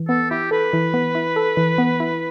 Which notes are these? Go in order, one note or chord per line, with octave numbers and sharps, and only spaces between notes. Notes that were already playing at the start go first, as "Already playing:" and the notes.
Already playing: E3
B3 A4
E4 G4
A4 B4
E3
B3
E4
A4
E3
B3
E4